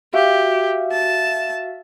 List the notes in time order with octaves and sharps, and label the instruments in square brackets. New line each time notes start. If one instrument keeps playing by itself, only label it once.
[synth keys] F#4 E5 F5 [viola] G4
[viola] A5